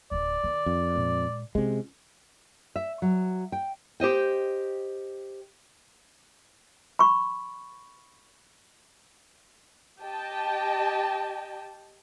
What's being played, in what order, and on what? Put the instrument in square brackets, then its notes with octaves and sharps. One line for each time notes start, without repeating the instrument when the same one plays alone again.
[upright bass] D1 D3 [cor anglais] D5
[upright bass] D#3
[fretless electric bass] F2
[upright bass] A#2 G#3
[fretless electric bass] C3 G#3 [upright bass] C#4 F4
[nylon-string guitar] E5
F#3
G5
G4 C5 D#5 G5
[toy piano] B5 C#6
[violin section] G4 D#5 G5 A5